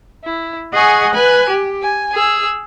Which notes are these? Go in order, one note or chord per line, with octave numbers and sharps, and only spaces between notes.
E4
G#4 D#5 F#5 G#5 C#6
B4 G#5 F#6
G4
G#5
G#4 E6